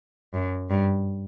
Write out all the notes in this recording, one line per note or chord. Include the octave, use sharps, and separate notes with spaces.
F#2
G2